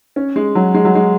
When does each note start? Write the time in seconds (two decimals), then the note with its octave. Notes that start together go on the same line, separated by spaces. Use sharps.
0.16 C#4
0.36 G#3
0.55 F#3
0.74 G#3
0.85 F#3
0.95 G#3